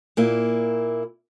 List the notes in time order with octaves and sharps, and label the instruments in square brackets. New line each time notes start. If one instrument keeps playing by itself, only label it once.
[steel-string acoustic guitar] A#2 A#3 E4